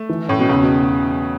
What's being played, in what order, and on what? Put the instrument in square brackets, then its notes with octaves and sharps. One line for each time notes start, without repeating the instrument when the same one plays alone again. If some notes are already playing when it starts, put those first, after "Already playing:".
Already playing: [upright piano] A3
[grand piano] E3
[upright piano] A2 [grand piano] C#4
[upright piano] B2
[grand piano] E2 [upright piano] C#3
[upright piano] B2